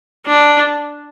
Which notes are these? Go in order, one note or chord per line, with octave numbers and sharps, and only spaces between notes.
D4